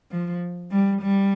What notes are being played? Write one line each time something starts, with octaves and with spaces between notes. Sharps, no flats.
F3
G3
G3